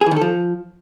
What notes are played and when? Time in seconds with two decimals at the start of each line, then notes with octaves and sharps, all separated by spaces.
0.01 G#4
0.06 E3
0.11 D#3
0.16 A4
0.21 F3